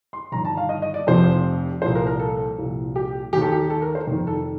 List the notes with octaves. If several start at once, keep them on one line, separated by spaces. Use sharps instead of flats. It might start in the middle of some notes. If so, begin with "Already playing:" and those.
C6
G1 G2 D#3 A#5
A5
F5
D#5
D#5
D5
F1 F2 C3 F3 C5
C2 A#2 F3 C5
A#4
A#4
A4
C2 A#2 F3
G4
D#2 D#3 G4
A4
G4
A4
A#4
C5
F1 F2 D#3
A4